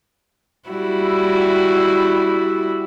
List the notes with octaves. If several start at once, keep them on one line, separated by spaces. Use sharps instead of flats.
G3 E4 F#4